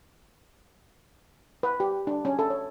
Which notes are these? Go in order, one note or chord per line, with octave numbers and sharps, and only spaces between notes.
B4
G4
D4
C#4
A4
C#5